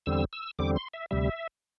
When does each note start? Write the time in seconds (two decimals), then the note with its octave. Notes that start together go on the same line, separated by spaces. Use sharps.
0.06 E2 D3 G3 C4 E6
0.33 E6
0.59 E2 D3 G3 C4 D6
0.76 C6
0.94 E5
1.11 D2 C3 G3 E5